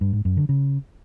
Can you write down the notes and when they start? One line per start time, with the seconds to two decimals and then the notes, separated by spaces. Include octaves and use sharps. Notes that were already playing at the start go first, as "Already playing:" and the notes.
0.01 G2
0.13 G#2
0.25 F#2
0.37 D3
0.49 C#3